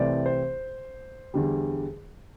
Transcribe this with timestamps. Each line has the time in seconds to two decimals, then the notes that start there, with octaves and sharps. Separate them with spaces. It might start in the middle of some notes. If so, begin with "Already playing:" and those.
Already playing: C2 C3 E3 A3 C4 D5
0.26 C5
1.34 E2 D3 G3